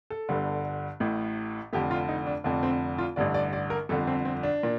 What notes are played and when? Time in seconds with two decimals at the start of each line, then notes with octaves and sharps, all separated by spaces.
0.10 A4
0.29 G1 G2 D3
1.00 A1 A2
1.73 F1 F2 D3 G4
1.91 F4
2.08 D#4
2.27 D4
2.44 F1 F2 D3 D4
2.63 C4
2.98 F4
3.16 A1 G2 D3 D5
3.34 D5
3.53 D5
3.70 A#4
3.89 G1 F2 D3 A4
4.07 C4
4.25 C4
4.43 D4
4.63 A#2